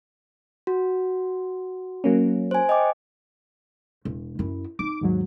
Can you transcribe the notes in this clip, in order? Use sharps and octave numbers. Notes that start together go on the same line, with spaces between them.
F#4
F#3 A#3 C#4
C5 G#5
D#5 G5 D6
E1
F#2 E4
D#4 D6
D#2 G#2 F#3